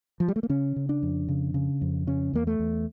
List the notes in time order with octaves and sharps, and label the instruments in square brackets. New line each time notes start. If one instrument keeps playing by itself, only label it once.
[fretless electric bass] F3
G3
A3
A#3
C#3 C#4
C#3
D4
F2
C#3
C#3
F2
C#3 C#4
E2 A#3
A3
E2